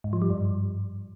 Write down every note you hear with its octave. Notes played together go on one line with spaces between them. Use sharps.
G#2
F3
G3
G2